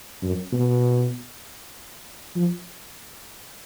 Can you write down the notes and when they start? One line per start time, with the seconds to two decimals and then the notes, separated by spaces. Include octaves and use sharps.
0.23 F#2
0.53 B2
2.36 F3